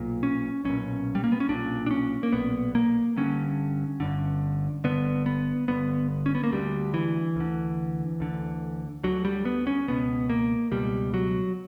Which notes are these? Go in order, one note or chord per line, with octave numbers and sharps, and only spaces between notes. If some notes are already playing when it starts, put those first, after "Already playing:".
Already playing: B1 A#2
C#4
B1 A#2 C#4
G3
A#3
B3
C#4
B1 A#2 D4
D4
C#4
A#3
B1 A#2 B3
A#3
G1 G2 D3 C#4
G1 G2 D3
G1 G2 D3 B3
B3
G1 G2 D3 B3
C#4
B3
A#3
D2 D3 G3
E3
D2 D3
D2 D3
D2 D3 F#3
G3
B3
C#4
C#2 B2 B3
A#3
C#2 B2 G3
F#3